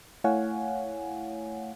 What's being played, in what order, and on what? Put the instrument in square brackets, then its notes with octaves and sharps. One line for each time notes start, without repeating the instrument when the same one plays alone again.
[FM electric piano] A3 E4 C#5 F5 F#5 G#5